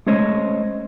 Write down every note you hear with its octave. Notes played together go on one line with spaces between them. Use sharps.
G#3 A3 C#4 C5 C#5 D#5